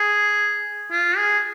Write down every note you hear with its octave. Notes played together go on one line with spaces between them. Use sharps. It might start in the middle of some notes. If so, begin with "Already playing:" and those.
Already playing: G#4
F4
G#4